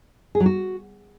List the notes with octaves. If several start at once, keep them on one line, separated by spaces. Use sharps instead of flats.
G#4
F#3
F#4